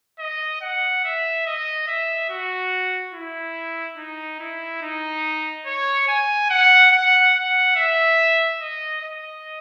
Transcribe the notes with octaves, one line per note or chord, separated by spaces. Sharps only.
D#5
F#5
E5
D#5
E5
F#4
E4
D#4
E4
D#4
C#5
G#5
F#5
F#5
F#5
E5
D#5
D#5